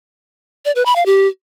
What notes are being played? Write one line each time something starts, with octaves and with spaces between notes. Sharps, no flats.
D5
B4
B5
F5
G4